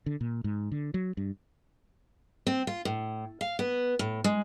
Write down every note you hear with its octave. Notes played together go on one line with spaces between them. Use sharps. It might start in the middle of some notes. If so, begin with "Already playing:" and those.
D3
A#2
G#2
D3
F#3
G2
C4
F4
A2
F5
B3
A2
G#3